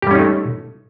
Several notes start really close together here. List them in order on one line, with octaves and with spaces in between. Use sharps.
G4 G3 C#4 D#4 A3